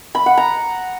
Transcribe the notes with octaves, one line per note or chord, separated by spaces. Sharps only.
B5
F#5
A#5